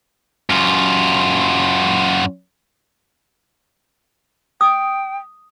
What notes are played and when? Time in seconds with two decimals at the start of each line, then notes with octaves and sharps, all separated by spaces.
0.50 F#2 F4
4.61 G5 D#6